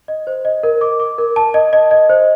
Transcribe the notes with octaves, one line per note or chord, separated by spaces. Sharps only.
D#5
C5
D#5
A#4
D6
D6
A#4
A5
D#5
D#5
D#5
C5